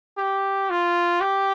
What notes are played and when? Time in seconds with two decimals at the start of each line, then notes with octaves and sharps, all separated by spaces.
0.18 G4
0.70 F4
1.21 G4